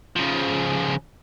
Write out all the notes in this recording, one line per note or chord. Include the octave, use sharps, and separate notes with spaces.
C#3 F3